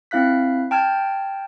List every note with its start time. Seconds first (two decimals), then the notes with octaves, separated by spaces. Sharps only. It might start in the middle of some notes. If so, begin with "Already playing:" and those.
0.11 C4 E4 F5 F#6 B6
0.71 G5 A5 F6 G6 G#6